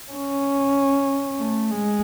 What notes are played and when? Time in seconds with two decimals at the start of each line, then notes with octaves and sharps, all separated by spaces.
0.12 C#4
1.39 A3
1.70 G#3